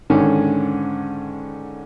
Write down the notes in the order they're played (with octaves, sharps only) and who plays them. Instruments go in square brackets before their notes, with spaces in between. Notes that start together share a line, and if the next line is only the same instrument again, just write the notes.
[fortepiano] G#2 D3 D#3 C#4